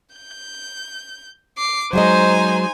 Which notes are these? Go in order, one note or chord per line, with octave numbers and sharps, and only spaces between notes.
G6
D6 C7
F#3 G#3 D#4 C5 D#5 G#5